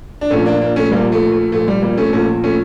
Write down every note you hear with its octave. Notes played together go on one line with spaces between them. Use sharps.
D4
A#1 A#2 F3 A3 C#4
A#3 D4
A#3 D4
A3 C#4
A#1 A#2 F3 G3 A#3
A3
A3
A#1 A#2 F3 A3
G3
G3 A#3
A3 C#4
A#1 A#2 F3 A3 C#4
A3 C#4